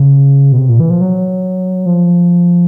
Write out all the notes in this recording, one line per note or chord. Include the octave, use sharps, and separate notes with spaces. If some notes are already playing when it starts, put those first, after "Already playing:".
Already playing: C#3
B2
C3
A#2
E3
F3
F#3
F3